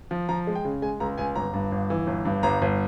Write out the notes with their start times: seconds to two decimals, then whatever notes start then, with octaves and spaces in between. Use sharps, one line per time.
0.11 F3
0.29 F3 A#5
0.47 G#3
0.55 G5
0.65 C#3
0.82 G#3 G#5
1.00 C#2 A#5
1.18 C#2 G#5
1.36 G1 A#5
1.54 G2
1.72 G1
1.90 E3
2.07 G1
2.25 G2
2.43 G1 A#5
2.62 G1